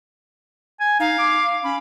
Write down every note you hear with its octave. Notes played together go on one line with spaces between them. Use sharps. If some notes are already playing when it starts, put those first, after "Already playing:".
G#5
D#4 F5
D6
C#4 B5